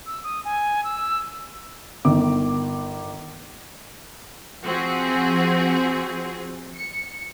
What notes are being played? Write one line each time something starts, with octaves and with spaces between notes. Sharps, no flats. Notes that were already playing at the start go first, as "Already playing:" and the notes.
E6
D#6
G#5
E6
G1 D#3 D6
F3 C4 F#4 G#4
C#7